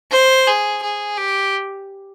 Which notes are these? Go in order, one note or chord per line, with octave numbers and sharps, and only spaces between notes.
C5
G#4
G#4
G4